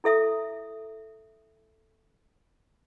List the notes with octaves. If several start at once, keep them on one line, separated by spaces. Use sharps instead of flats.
E4 A4 E5 D#6